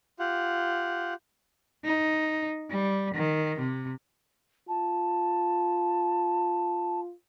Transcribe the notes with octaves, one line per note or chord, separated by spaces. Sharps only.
F4 G4 F#5
D#4
G3
D#3
C3
F4 A5